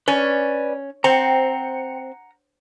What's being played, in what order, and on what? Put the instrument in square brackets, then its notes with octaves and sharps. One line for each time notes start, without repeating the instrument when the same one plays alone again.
[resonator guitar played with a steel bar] C#4 [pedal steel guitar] B4 D5 G#5
[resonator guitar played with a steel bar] C4 [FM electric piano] C5 G5 C#7 [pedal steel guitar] F#5 A#5